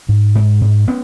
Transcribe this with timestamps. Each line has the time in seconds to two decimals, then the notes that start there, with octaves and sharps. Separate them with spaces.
0.09 G#2
0.35 G#2
0.61 G#2
0.88 B3 C#4